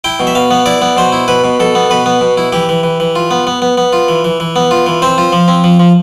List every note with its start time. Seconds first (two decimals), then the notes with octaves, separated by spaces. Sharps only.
0.04 E4 G5
0.20 B2
0.27 E5
0.35 B2 F5
0.51 B3
0.66 E4 D5
0.82 B3
0.97 B2 C5
1.12 E4
1.28 B2 B4
1.44 B2
1.60 B2 A4
1.75 B3
1.90 B2 B4
2.06 B3
2.21 B2
2.37 E4
2.53 E3 G4
2.69 E3
2.83 E3
3.00 E3
3.16 F4
3.31 B3
3.47 B3
3.62 B3
3.77 B3
3.93 F4
4.08 E3
4.24 E3
4.40 E3
4.56 B3
4.71 F4
4.86 E3
5.02 C4 C5
5.18 F4
5.32 F3
5.48 C4
5.64 F3
5.79 F3